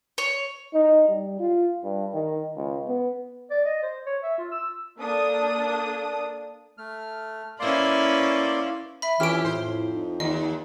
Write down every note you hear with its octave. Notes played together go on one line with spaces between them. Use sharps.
C#5
D#4
G3
F4
G2
D#3
C#2
B3
D5
D#5
C5
C#5
E5
F4
E6
A#3 D4 A4 D#6
A3 F6
A#3 C#4 E4 B4 D5 C6
E5 B5
F2 E3 C#4 E4 G4 F6 D7
A2 C5
D#4
D#2 D#5